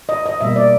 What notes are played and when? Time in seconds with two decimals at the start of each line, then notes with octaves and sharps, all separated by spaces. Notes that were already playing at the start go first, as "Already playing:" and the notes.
0.09 D#5
0.26 D#5
0.41 B2 G3 A#3 E5
0.56 D5